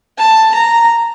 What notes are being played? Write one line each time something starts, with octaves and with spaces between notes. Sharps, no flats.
A5
A#5